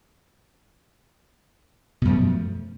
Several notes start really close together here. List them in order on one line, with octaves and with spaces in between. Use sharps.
B2 F#2 F3 A3